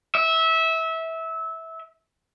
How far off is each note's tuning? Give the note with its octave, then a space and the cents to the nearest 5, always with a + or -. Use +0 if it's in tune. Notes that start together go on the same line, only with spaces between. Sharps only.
E5 -20